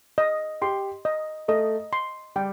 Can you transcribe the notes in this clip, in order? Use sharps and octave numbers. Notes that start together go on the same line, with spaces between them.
D#5
G4 C6
D#5
A3 D#5
C6
G3 G5